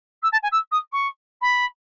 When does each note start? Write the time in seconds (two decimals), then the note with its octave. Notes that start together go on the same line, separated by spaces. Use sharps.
0.22 E6
0.32 A5
0.42 G#5
0.51 E6
0.71 D#6
0.92 C#6
1.41 B5